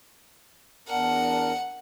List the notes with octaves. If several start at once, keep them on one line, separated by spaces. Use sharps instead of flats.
E2 D4 A#4 F#5